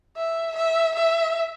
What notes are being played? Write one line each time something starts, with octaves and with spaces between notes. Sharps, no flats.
E5
E5
E5